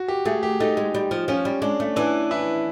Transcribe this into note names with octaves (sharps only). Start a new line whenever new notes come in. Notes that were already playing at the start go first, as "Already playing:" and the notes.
Already playing: F#4
G4
A3 G#4
G4
A3 D#4
G#3
G3
F3
F3 C#4
G3
G#3 D4
A3
E3 D4
E4